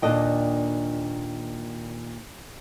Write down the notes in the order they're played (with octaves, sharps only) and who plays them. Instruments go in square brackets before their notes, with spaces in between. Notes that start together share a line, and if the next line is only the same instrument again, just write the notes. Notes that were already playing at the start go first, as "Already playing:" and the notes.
[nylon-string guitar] D#2 A#2 D4 A4 D#5 G5